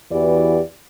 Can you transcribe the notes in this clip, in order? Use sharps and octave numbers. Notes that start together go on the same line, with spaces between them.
E2 E3 F#4 G4 B4 D5